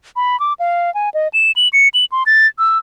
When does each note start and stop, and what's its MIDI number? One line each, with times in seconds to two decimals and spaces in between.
0.16 0.39 83
0.40 0.53 86
0.60 0.93 77
0.95 1.10 80
1.14 1.28 75
1.34 1.52 100
1.56 1.68 102
1.73 1.88 97
1.94 2.05 102
2.12 2.23 84
2.26 2.47 93
2.59 2.78 88